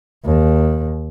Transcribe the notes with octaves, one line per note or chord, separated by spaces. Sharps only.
D#2